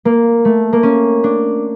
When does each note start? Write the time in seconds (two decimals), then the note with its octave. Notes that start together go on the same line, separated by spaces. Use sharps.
0.05 A#3
0.45 A3
0.73 A#3
0.83 C#4
1.24 D4